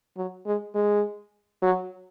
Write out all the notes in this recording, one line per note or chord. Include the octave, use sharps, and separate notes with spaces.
F#3
G#3
G#3
F#3